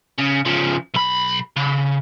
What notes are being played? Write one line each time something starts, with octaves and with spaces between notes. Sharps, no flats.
C#3
C#3 F3
B1 B5
C#3